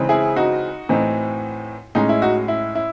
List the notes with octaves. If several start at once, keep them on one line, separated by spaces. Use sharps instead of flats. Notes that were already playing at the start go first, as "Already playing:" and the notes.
Already playing: C#3 E3 G#3 C4 D#4
E4 G#4
D#4 F#4
A2 E3 C4 D#4
A2 G#3 C#4 D#4
E4
D#4 F#4
E4
E4